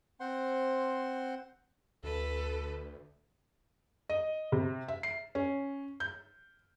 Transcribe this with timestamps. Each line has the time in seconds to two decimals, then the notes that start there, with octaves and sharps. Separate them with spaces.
0.20 C4 C5 F#5 C6
2.04 D2 A4 B4
4.09 D#5
4.52 C3
4.88 E5
5.03 C7
5.35 C#4
6.00 G6